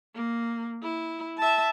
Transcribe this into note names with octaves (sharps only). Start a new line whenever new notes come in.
A#3
E4
E5 A5